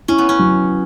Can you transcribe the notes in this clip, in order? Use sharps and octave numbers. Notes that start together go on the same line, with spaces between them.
C#4 E4
B3
C#4
F#3